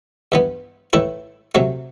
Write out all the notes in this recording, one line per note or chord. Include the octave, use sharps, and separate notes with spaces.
G2 E3 B3
A2 E3 A3 E4
C3 F#3 A3